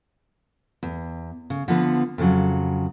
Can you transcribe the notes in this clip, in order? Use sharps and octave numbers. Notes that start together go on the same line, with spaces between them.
E2
C#3
D3 F3 B3
F2 C#3 F#3